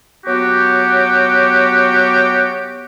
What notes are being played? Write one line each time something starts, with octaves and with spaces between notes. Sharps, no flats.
F#3 B3 F#4 G4